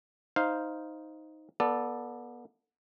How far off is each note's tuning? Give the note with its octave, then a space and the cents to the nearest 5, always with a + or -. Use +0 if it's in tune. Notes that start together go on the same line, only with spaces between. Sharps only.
D#4 +5 C5 +0 F5 +0
B3 -30 A4 +0 D5 +0